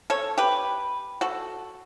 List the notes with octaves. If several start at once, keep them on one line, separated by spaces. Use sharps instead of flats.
A4 C#5
G4 B4
F#4 A4